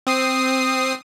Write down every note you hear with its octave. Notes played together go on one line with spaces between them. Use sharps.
C4 D#6 C7